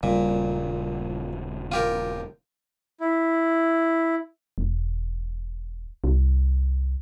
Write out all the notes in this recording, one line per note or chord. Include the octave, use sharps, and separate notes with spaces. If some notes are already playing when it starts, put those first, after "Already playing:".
D#1 A#2 C#3 G3
F4 G4 A#4
E4
E1
C2